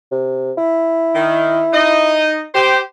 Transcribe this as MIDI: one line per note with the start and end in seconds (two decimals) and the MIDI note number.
0.12 0.52 48
0.57 2.26 64
1.15 1.63 51
1.73 2.44 63
1.73 2.44 75
2.54 2.79 67
2.54 2.79 72